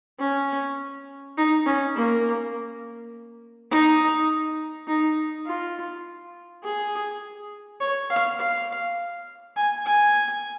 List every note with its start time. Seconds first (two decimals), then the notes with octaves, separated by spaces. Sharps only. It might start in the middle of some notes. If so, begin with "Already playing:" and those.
0.19 C#4
1.37 D#4
1.66 C#4
1.95 A#3
3.71 D#4
4.87 D#4
5.46 F4
6.63 G#4
7.80 C#5
8.10 F5
8.39 F5
9.56 G#5
9.86 G#5